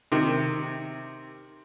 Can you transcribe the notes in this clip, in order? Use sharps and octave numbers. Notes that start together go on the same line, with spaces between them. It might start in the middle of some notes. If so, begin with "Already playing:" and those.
C3 D#3